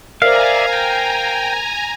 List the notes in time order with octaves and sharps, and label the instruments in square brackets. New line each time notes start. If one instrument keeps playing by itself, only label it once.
[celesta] A#4 C5 [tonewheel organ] D5 E5 [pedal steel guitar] F5 [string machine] G#5 A#5
[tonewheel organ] G5